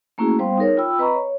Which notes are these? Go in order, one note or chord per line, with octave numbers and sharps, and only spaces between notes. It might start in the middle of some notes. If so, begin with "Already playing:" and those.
A3 A#3 C#4 E4 F#4 G#4
G3 B3 C5 F5 G5 C6
D#4 G#4 A#4 C#5
F4 G5 B5 E6
C4 B4 D#5 A#5 B5 C#6
C#5